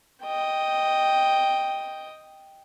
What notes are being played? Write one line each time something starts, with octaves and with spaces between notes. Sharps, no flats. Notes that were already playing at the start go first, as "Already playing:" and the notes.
D#5 G5